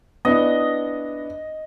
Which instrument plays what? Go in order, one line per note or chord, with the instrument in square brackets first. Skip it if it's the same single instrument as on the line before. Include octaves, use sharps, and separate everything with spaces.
[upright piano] B3 D4 E4 [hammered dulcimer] D#5